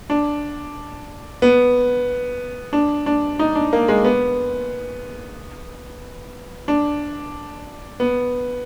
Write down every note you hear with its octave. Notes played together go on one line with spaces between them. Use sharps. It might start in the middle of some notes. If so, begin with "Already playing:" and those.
D4
B3
D4
D4
D#4
D4
A#3
G#3
B3
D4
B3